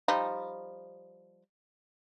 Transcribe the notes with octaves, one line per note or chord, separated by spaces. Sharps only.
F3 G3 D#4